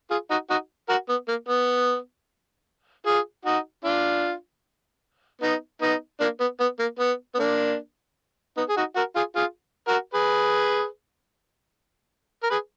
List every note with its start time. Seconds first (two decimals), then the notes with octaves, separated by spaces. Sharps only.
0.10 F4 G#4
0.30 D#4 F#4
0.50 D#4 F#4
0.89 F#4 A#4
1.09 B3
1.28 A#3
1.48 B3
3.06 F4 G#4
3.45 D#4 F#4
3.84 D4 F4
5.42 B3 D#4
5.82 B3 D#4
6.20 A#3 D4
6.40 B3
6.60 B3
6.79 A#3
6.99 B3
7.35 B3
7.39 A#3 D4
8.57 B3 D#4
8.69 G#4
8.77 D#4 F#4
8.96 F#4 A#4
9.15 F4 G#4
9.36 F4 G#4
9.88 F#4 A#4
10.14 G#4 B4
12.43 A#4
12.50 G#4 B4